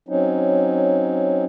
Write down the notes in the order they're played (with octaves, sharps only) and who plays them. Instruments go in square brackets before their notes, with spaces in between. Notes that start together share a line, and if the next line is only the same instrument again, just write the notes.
[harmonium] F#3 C4 C#4 D#4